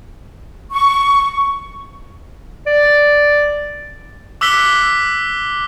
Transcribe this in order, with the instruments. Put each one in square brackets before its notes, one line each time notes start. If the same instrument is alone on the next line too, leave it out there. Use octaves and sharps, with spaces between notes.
[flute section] C#6
[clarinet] D5
[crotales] D6 E6 F#6 B6 G7